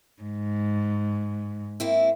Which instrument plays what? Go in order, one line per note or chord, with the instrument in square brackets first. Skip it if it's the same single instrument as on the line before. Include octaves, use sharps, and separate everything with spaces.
[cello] G#2
[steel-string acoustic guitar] A#3 C4 E4